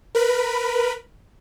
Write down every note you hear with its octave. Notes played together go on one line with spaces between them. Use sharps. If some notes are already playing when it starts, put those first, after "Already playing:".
A#4 B4 B5